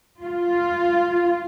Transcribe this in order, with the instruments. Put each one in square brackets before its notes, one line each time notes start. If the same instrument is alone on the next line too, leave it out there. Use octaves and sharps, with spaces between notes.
[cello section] F4